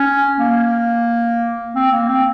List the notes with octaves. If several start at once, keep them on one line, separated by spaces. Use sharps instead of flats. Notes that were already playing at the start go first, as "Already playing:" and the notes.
Already playing: C#4
A#3
C4
A#3
C4